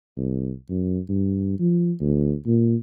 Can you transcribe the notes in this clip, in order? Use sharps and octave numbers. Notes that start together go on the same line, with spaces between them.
C2
F#2
G2
F3
D2
A#2